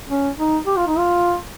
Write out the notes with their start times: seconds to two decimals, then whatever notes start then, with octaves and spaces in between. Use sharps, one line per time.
0.10 C#4
0.38 D#4
0.66 G4
0.77 F4
0.87 D#4
0.98 F4